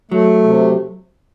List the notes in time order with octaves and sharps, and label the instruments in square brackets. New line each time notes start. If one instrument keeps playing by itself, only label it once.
[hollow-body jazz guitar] F#3 [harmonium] A3
[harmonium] C3